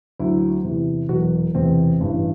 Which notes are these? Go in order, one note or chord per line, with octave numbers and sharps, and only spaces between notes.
D2 D3 F#3 E4
E2 C3 E3
E1 E2 B2 F#3 F#4
E1 E2 C3 C4
A1 G2 E3